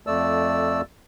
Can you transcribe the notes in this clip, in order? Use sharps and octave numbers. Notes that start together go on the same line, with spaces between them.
F2 A3 D5 E6